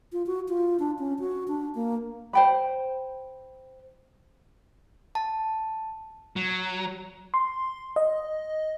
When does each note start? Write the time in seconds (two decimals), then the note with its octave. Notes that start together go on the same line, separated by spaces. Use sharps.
0.13 F4
0.26 F#4
0.49 F4
0.80 D4
0.99 C#4
1.19 F#4
1.48 D4
1.75 A#3
2.33 C5 G5 B5
5.15 A5
6.36 F#3
7.34 C6
7.96 D#5